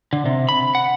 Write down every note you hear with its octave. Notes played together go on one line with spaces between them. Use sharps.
D3
C3
B5
F#5